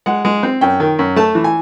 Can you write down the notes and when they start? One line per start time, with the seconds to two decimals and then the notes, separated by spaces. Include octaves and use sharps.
0.06 G#3 F#5
0.25 G#3
0.43 C4
0.61 F#2 G5
0.80 D#3
0.99 F#2
1.16 A3 A5
1.35 E3
1.44 G#5